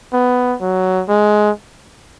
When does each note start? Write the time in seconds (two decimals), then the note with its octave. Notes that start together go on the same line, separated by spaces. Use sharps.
0.13 B3
0.61 F#3
1.08 G#3